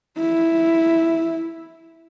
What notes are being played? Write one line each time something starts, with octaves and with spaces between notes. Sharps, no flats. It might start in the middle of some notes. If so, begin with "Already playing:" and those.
E4